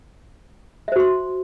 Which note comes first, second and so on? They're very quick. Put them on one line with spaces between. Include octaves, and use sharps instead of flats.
E5 C5 F#4 C6